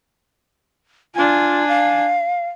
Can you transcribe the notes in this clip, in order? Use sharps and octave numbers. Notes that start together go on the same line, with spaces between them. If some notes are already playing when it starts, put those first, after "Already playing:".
D4 F4 G#5
F5